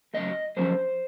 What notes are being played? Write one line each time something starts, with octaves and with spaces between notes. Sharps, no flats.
F#2 C#3 F#3 A3 D#5
F#2 D3 F3 C#4 C5